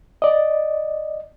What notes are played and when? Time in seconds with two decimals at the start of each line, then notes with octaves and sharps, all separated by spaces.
0.22 D5 D#5